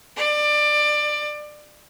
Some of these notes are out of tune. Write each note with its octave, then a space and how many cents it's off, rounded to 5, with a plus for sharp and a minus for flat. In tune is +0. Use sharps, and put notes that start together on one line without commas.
D5 +20